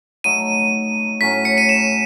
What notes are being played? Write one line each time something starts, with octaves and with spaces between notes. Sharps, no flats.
F#3 A3 D#4 D#7
A2 F#3 C#4 B6
C#7
D#7
E7